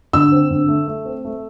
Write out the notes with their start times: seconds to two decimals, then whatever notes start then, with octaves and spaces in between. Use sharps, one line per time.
0.13 D3 E6
0.32 C4
0.51 D3
0.68 A3
0.87 A3
1.05 C4
1.25 A3